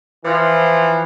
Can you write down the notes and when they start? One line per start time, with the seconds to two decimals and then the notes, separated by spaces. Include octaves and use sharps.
0.24 E3 F3